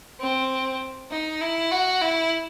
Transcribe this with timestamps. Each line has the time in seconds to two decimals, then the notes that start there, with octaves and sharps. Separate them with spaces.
0.20 C4
1.11 D#4
1.41 E4
1.71 F#4
2.02 E4